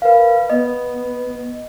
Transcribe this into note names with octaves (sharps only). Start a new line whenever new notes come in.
A#4 B4 F5
B3 D#5